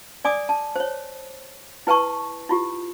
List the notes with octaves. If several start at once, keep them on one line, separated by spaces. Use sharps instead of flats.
D5 G#5 D6 D#6
A5
C5 C#5
E4 B4 G5 A5 C#6
E4 F4 G4